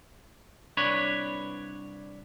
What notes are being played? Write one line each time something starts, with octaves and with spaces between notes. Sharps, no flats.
C2 D4 B4 C#5